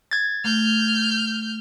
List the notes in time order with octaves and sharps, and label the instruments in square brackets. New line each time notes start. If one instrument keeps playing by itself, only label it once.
[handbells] G#6 A6
[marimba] A3 [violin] F6 G6